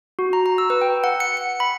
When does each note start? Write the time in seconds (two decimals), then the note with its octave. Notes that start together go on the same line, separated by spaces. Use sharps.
0.19 F#4
0.33 A#5
0.46 A#5
0.58 E6
0.70 B4
0.81 G5
1.04 F#5
1.20 C#7
1.37 C#7
1.60 B5